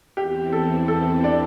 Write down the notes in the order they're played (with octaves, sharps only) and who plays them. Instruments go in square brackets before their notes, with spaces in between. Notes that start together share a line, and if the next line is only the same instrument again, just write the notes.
[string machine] E2 E3 C4 E4 [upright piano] G4
[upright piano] A4
A4
D4 D5